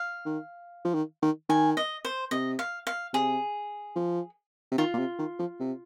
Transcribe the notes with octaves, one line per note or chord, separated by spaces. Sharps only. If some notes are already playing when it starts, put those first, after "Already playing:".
Already playing: F5
D#3
F3
D#3
D#3
D#3 G#5
D#5
C5
C3 D#5
F5
F5
C3 G#4
F3
C3
D#3 F4
A#2
C3
D#3
F3
C3